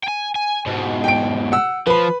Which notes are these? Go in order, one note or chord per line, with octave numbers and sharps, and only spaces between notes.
G5 G#5
G#5
G#2 B2
G5 D7
F#5 E6
F3 B4 B5